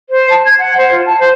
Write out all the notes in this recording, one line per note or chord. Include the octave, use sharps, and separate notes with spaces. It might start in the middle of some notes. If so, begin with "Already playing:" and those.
C5
A5
G#6
F#5
C5
F4
A5
C5